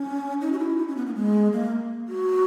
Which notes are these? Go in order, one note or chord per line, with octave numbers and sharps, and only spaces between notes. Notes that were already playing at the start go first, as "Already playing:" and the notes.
Already playing: C#4
D#4
F#4
E4
D#4
C#4
B3
A#3
G#3
A#3
F#4